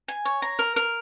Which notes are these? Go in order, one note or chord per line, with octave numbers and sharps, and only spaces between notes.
G#5
C#5
A#5
A#4
A#4